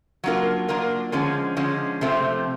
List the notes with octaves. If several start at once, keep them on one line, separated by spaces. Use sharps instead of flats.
F#3 A#3 D4 F4 A#4
F#3 A#3 D4 F4 A#4
D3 F3 G#3 C#4
D3 F3 G#3 C#4
C3 F3 A3 C4